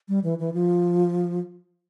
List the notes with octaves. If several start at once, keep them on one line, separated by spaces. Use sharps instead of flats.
G3
E3
E3
F3